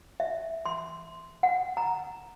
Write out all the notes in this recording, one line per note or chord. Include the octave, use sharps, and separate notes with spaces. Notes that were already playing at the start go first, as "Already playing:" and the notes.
E5
C6
F#5
A#5